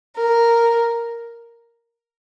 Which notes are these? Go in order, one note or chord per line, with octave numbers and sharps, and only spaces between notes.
A#4